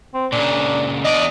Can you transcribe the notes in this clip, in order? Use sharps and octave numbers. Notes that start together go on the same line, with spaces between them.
C4
A#2 C#3 D4
E2 D4 D5 D#5